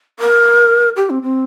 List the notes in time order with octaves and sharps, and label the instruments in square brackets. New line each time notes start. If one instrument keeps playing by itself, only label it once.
[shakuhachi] A#4
G4
C4
C4